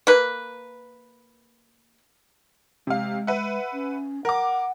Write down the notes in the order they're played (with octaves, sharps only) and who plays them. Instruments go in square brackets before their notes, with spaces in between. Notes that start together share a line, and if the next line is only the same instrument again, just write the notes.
[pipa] A#3 B4
[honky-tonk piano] C3 F5 [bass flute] G#3
[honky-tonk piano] B4 E5 F#5
[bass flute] C#4
[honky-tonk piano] A#4 D6 [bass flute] F#5